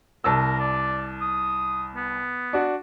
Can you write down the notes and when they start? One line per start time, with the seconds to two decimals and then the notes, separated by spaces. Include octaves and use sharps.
0.24 C2 A#4 A5 E6
0.59 D5
1.21 D#6
1.95 B3
2.53 D4 F#4